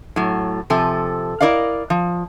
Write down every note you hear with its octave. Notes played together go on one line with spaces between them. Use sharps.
A2 F#3
C3 F3 A4 G#5
E4 A#4 D5 D#5 F5
F3